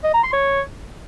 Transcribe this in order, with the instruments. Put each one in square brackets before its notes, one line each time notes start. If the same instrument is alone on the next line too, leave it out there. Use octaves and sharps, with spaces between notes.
[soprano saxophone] D#5
A#5
C6
C#5